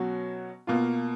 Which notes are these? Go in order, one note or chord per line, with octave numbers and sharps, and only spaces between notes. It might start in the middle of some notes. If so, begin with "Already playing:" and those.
Already playing: B2 F#3 C#4 F#4
B2 A#3 F4